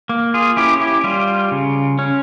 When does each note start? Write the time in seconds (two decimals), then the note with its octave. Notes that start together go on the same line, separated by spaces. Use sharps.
0.09 A#3
0.34 F4 G#4
0.57 C#4 E4 G4
0.81 E4 G4
1.04 G3 F4
1.52 C#3
1.99 C#4